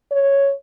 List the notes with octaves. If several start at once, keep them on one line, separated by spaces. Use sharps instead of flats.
C#5